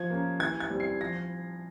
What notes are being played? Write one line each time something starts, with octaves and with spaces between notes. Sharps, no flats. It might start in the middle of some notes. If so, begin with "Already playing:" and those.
Already playing: F3 G#6
A#3 C#4
E3 G#6
G#6
G3 C4
C7
F3 A#6